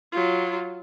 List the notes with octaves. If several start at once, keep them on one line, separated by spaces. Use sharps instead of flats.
F#3 F4